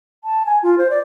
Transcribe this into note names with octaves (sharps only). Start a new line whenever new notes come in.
A5
G#5
F4
C5
D5